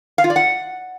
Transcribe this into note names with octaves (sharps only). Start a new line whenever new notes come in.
F5
F4
D5
F#5